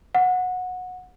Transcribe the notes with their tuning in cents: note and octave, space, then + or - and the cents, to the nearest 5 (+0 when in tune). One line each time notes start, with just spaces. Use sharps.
F#5 -20